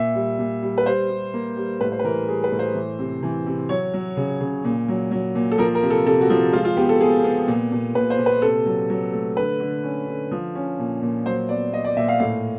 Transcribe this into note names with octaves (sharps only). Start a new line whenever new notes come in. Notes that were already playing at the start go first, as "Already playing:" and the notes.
Already playing: A#2 E5
G3
A#2
G3
B4
G3 C5
G3
A#3
G3
A2 B4
C5
B4
E3 A#4
G3 G#4
B4
A2
C5
E3
C3
E3
C3
F#3 C#5
F#3
C#3
C#3
A#2
F#3
F#3
A#2
A4
F3 A#4
A#4
C3
A4
C3 A4
F#4
F3
G#3 F4
F4
B3 G4
A4
B3 G#4
B3
A#2
A#2
A#2 B4
C5
A#2
B4
C3 A4
F#3
F#3
A3
D3 B4
D3
C#4
D3
F3
C#4
A#2
A#2
F#3 C5
B3 D5
B3 D#5
D5
A#2 E5
F5
A2 F5